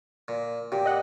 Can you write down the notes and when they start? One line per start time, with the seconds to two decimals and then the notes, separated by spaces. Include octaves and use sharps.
0.28 A#2
0.72 A#2 G4
0.86 D#5 F#5